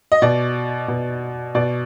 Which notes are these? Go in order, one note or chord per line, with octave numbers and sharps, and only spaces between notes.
D#5
B2 D5
B2
B2 D5